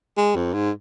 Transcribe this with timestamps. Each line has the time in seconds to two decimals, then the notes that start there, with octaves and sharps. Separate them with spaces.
0.17 G#3
0.36 F2
0.54 G#2